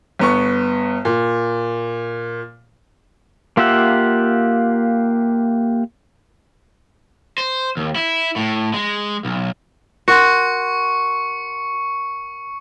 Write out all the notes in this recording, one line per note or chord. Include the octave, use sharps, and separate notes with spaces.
G1 B3 C#6
A#2
A#3 F4 G4 E5 F#5
C5
D#2
E4
A2
G#3
B1
F#4 A#4 F#5 C6 C#6 C#7